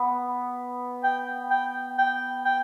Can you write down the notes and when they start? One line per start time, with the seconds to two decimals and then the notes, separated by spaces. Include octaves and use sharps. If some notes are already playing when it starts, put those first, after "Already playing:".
Already playing: B3
1.03 G5
1.50 G5
1.98 G5
2.45 G5